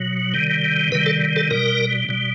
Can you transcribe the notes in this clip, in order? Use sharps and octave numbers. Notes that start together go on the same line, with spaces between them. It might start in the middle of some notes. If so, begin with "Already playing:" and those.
Already playing: B2 F#3
C3 D#3 G3
C3 D#3 G3 B4
A4
A4
B2 G3 A#4
B2 G3